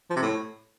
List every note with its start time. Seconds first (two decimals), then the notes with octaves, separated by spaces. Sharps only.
0.10 F3
0.16 C3
0.22 A2